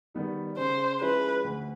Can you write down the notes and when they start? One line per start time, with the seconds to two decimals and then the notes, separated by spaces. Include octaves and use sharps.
0.14 D#3 G3 B3 D#4
0.58 C#3 C5
1.01 F3 G#3 C#4 E4 B4
1.44 D2